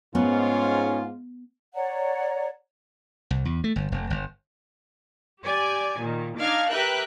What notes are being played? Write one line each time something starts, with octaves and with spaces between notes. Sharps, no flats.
G#2 B3 C#4 F4
C#5 D5 F#5 A#5
C2
E2
A3
G1
F1
G1
G4 D5 G#5
A#2 D#3
D4 D#4 F5 D6 F6 G#6
G4 A#4 B4 E5 G5 F#6